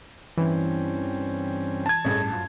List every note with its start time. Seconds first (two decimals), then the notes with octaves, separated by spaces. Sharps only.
0.38 G2 E3 C4 C#4
1.86 A5 G#6
2.05 A1 G2 G#4 A4 C#5 D#5
2.32 F#2 F4